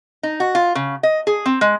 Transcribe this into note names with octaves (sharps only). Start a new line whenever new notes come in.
D#4
F#4
F4
C#3
D#5
G#4
C4
G#3